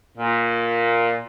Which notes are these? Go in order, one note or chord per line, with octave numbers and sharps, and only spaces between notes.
A#2